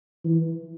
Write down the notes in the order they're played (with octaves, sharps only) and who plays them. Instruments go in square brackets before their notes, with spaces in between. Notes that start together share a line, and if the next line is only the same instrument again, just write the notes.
[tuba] E3